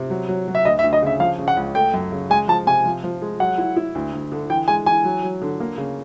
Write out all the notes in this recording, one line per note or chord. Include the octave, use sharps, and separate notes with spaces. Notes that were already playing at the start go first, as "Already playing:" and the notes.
Already playing: C3
F#3
F#3
F#3
E5
D2 D#5
E5
D2
D#5
C#3 E5
F3 F5
C#3
F#5
C#2
A3 G5
F#2
C#3
G#3 G#5
F3 A5
C3 G#5
F3
F3
G#3
F#3 F#5
E4
E4
D2
D2
D3
E3 G5
G#3 G#5
E3 G#5
F#3
F#3
D3
A#3
C#3